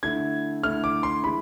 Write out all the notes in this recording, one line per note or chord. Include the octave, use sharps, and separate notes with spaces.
D3 A3 E4 G#6
D3 A3 E4 F6
D6
C6
E3 G#3 B5